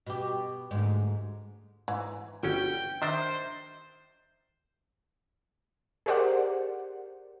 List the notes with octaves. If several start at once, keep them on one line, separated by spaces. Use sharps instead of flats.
B2 G4
D2 G#2
G#2 E3
G1 C#4 F#4 G5
D#3 D4 C5 D#5 E5
G4 G#4 A#4 C5 D5 F#5